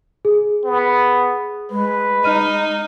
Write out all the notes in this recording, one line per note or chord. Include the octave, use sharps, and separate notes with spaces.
G#4
B3
G#3 B4
D#4 F6 D#7